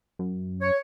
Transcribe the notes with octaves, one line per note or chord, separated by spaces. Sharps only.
F#2
C#5